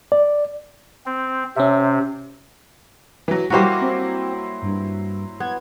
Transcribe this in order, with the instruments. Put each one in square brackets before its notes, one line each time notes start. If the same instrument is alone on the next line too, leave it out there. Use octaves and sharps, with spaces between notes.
[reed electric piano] D5
[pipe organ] C4
[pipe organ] C3 [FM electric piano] C#4 E5
[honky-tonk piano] E3 F#3
[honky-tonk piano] F#3 E4 C5 [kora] G3 A#3 F#4
[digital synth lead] C4
G2
[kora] B3 [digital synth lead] G#6